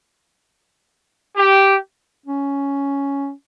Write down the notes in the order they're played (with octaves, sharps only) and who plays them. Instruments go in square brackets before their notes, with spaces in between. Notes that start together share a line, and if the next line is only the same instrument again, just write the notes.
[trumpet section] G4
[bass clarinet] C#4